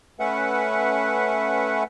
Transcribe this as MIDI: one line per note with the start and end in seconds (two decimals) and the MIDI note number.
0.20 1.83 57
0.20 1.83 61
0.20 1.83 71
0.20 1.83 76
0.20 1.83 78